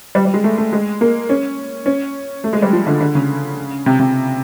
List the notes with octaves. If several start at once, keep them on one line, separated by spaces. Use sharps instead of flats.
G3
G3
G#3
A3
A3
G#3
A#3
C#4
C#4
A3
G#3
G3
F3
D3
D3
C#3
C3
C3